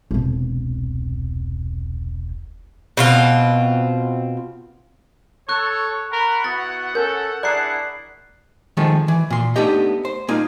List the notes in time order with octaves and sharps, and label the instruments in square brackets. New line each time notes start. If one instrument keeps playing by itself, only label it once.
[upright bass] E1 C2
[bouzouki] B2 C4 F4
[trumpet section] A4 [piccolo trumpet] C#5 [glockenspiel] C#6 F#6
[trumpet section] A#4 B5 [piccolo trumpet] F#5
[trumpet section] B3 E4 F#4 [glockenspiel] A6
[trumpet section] C#4 A4 [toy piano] A#4 [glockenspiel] G6
[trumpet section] D4 E4 G#4 [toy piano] D5 A#5 [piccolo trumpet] F#5 [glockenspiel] F#6 C7
[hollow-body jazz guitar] D#3 F3 G#3 A3
E3
A#2 C6
A3 B3 D4 D#4 G4 D#5
C5
A#3 D#4 F4